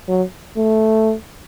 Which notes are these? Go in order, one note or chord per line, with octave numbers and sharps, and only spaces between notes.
F#3
A3